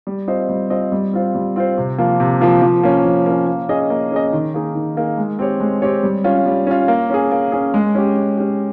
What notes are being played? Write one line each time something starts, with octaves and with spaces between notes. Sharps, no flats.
G3
C4 F4 C5 D#5
G3
C4 F4 C5 D#5
G3
C4 F4 C5
G3
C4 F4 C5
C3
F3 A#3 F4
C3
F3 A#3 F4
F3
A#3 C#4
F3
A#3 C#4
A#3
C#4 G#4 D#5
A#3
C#4 G#4 D#5
D#3
A#3 D#4 G#4
D#3
A#3 D#4 G#4
G#3
C4 G4 C#5
G#3
C4 G4 C#5
G3
C#4 F4
G3
C#4 F4
A#3
C#4 G#4
A#3
C#4 G#4
G#3
C#4 G4
G#3
C#4 G4